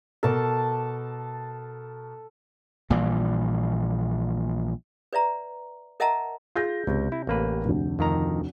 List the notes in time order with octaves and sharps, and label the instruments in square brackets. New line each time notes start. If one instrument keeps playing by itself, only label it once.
[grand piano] B2 A#4 [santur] A4 A5 D6
[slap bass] A#1 A#2 E3 G3
[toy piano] B4 D5 E5 A#5
A#4 D#5 E5 F#5 A5 A#5
[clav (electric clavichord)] F4 [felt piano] G#4 G6 A#6
[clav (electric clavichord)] C#2 [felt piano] C3
[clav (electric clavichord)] E4
A1 A#3 B4
[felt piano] F1 D2
[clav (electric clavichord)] F2 D#3 A#5